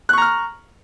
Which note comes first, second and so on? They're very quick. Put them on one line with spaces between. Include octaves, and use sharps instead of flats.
F#6 C#6 A#5 F6